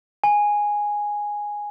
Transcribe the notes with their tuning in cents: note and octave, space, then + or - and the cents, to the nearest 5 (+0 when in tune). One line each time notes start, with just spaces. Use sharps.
G#5 -5